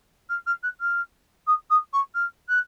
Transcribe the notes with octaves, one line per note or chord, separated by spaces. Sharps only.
F6
F6
F#6
F6
D#6
D#6
C#6
F6
F#6